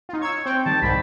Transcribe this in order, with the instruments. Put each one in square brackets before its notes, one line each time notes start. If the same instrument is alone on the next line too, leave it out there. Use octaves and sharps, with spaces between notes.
[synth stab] D#4 F4
[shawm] C#5 [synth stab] E6 G#6
[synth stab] C4 [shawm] G5
[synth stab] D#3 G3 [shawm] A5
[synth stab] C2 G#2 G3 [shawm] B5